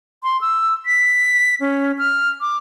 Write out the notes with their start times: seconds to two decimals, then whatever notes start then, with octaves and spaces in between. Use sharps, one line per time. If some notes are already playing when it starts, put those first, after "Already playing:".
0.23 C6
0.41 E6
0.86 B6
1.60 C#4
1.98 F6
2.41 D6